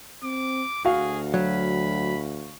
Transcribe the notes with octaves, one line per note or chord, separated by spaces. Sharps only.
C4 D6
D2 F#4 G#4 F5
F#3 B5